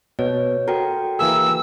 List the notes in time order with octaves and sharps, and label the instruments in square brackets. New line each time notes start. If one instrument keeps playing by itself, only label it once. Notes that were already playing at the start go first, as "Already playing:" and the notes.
[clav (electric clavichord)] B2 [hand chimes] C#5
[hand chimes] F#4 A4 G5 [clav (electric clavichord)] A#4
[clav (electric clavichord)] E3 A#3 G#4 [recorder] E6